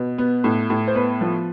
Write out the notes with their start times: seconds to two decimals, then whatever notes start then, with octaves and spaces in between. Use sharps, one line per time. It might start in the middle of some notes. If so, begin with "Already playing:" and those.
Already playing: B2
0.18 B3
0.44 A2
0.70 A2
0.87 C5
0.95 B3 B4
1.21 F3